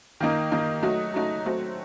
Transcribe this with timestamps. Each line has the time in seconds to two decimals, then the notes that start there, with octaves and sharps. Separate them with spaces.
0.20 D#3 A#3 D#4
0.52 D#3 A#3 D#4
0.82 F#3 A3 D#4 F#4
1.14 F#3 A3 D#4 F#4
1.46 F#3 A3 C4 F#4